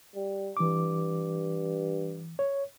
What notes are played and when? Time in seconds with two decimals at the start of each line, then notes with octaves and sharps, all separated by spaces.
0.15 G3
0.57 G2 E3 D6
2.39 C#5